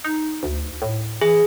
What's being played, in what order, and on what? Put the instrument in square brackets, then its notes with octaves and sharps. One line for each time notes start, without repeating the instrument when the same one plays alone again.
[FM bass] D#4
D2
A2
[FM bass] E3 [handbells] G#4